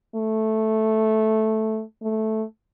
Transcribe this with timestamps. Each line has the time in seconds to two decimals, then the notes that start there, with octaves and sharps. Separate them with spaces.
0.15 A3
2.03 A3